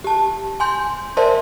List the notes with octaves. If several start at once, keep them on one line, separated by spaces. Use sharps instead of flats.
G4 A5
G#5 C6 G6
A#4 C5 D5 E5 A5 C6